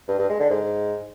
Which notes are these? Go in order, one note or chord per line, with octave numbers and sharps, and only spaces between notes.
G2
G2
G#3
D3
G#2